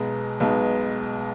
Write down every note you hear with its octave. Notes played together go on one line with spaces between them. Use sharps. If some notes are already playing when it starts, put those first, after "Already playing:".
Already playing: B1 B2 G#3 B3 A#5
B1 B2 G#3 B3